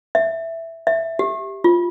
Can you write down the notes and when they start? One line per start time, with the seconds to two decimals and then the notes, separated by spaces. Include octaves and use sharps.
0.15 E5
0.87 E5
1.19 G4
1.64 F4